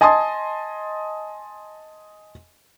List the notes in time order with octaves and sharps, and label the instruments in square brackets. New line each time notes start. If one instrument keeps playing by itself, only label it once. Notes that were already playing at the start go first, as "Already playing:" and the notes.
[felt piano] D#5 G#5 A5 C6 D#6